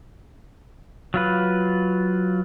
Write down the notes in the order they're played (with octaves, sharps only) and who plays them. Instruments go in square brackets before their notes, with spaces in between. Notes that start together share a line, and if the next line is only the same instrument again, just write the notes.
[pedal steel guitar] F#3 F4 B4